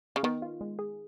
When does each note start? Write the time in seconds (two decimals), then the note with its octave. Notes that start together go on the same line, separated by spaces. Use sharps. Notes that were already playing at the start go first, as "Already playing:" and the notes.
0.16 C#3
0.23 D#3 B3
0.42 F4
0.61 G#3
0.79 G#4